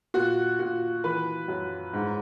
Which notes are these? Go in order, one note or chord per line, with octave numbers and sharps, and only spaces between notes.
A#2 F#4
A#2 F#4
E3 B4
F#2
G#2